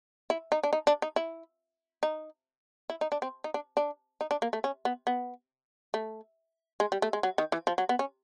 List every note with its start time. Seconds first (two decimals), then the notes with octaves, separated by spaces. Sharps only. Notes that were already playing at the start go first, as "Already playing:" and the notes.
0.30 E4
0.52 D#4
0.64 D4
0.73 D#4
0.87 D4
1.02 D#4
1.16 E4
2.03 D#4
2.90 E4
3.01 D#4
3.12 D4
3.22 C4
3.44 D#4
3.54 D4
3.77 D4
4.21 D#4
4.31 D4
4.42 A#3
4.53 A3
4.64 C#4
4.85 B3
5.07 B3
5.94 A3
6.80 G#3
6.92 G3
7.02 A3
7.13 G#3
7.23 F#3
7.38 D#3
7.52 E3
7.67 F3
7.78 F#3
7.89 B3
7.99 C#4